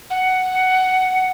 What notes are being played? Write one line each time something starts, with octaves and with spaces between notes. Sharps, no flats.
F#5